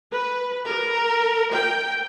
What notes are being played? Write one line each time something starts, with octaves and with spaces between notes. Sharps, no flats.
B4
A#4
G5